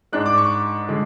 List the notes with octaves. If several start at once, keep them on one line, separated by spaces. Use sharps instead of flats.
G#2 G#3 D4 F#6
D6
C#6
D3 G#3